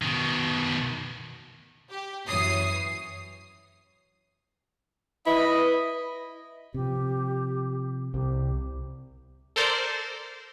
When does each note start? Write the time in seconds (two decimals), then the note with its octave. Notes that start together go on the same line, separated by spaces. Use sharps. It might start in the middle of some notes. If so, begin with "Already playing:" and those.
0.02 B2 D#3
1.90 G4
2.27 F#2 E3 C#5 D#6 C7
5.26 E4 B4 D#5
6.74 C3 F3 G4
8.14 C2 C4 G4
9.56 A4 A#4 C5 D5